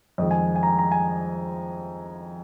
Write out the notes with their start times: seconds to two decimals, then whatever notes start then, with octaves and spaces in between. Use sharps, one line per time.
0.18 F2 D#3 G#3 D#5
0.31 G#5
0.56 G#5
0.63 A#5
0.67 G#5
0.79 A#5
0.92 G#5